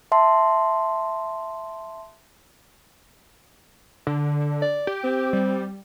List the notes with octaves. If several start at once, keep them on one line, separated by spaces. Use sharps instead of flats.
E5 A5 C6
D3
D5
G4
C4
G3